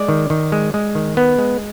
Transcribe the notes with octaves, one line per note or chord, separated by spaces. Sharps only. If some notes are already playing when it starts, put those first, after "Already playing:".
Already playing: G#3 D5
D#3
D#3
G#3
G#3
D#3
B3
G#3